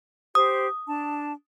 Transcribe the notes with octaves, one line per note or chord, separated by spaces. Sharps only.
G4 C5 D#6
D4 A5